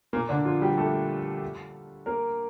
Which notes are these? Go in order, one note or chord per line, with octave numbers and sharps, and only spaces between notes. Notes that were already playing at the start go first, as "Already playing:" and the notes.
A#2 A#3
D3 D4
F3 F4
G3 G4
A3 A4
A#3 A#4